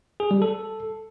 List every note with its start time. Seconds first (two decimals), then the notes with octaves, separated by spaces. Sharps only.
0.20 G#4
0.31 G3
0.42 A4